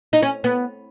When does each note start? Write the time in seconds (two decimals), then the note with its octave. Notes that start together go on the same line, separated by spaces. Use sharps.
0.13 D#4
0.22 C#4
0.44 B3